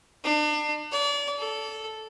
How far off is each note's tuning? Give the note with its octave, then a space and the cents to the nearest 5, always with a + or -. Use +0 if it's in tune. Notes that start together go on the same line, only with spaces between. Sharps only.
D4 +35
D5 -35
A4 -5